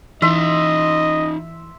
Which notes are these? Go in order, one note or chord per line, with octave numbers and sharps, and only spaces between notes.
E3 D#4 F4 D#5 E5 C6